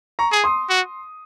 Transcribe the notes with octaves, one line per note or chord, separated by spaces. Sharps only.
A#5 C#6
G#4
C6 D#6
F#4